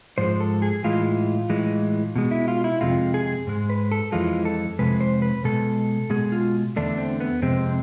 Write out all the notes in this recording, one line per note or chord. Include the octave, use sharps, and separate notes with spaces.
G#2 F3 G#3 C5
A4
G#4
A2 E3 G#3 F4
A2 E3 G#3
B2 G#3
E4
F4
E4
F2 C3 G#3 F4
G#4
G#2 G#3
B4
A4
F2 E3 G#3 F4
A4
F2 C3 G#3 B4
C5
B4
B2 G#3 A4
B2 G#3 G#4
F4
E2 D3 A3 D4
C4
B3
F2 C3 G#3 C4